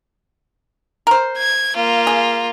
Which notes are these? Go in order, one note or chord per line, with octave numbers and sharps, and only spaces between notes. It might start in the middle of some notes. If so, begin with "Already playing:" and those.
A#4 C5
G#6
A#3 F4
G#4